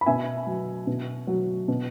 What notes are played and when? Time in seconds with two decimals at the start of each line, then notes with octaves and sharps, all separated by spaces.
0.01 B5
0.06 B2 E5 G#5
0.46 F#3
0.87 B2
1.27 F#3
1.68 B2